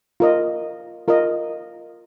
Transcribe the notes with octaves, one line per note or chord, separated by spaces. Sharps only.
F4 A#4 D#5
F4 A#4 D#5